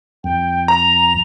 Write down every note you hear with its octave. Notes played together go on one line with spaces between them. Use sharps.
F2 G5
A#5 F7